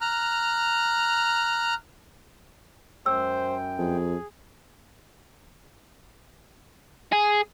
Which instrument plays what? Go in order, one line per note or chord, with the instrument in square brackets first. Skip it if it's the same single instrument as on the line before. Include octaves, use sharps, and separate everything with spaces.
[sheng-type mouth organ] A#5 F6 F#6
[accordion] F#2 G5 [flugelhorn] C5 [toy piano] E6
[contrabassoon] F2 [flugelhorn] G#4
[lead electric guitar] G#4